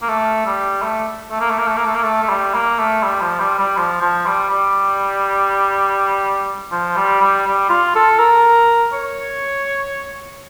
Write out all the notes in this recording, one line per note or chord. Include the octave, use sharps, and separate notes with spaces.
A#3
A3
G3
A3
A3
A#3
A3
A#3
A3
A#3
A3
A#3
A3
A3
G3
A#3
A3
G3
F3
G3
G3
F3
F3
G3
G3
F3
G3
G3
G3
F4
A4
A#4
C#5